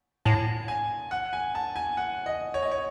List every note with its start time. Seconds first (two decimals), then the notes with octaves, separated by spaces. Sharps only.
0.25 A2 A5
0.68 G#5
1.11 F#5
1.33 G#5
1.55 A5
1.76 G#5
1.97 F#5
2.26 D#5
2.54 C#5
2.62 D#5
2.71 C#5